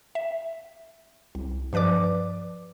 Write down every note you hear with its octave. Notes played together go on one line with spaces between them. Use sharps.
E5
C2
G2 F3 B4 D5 D6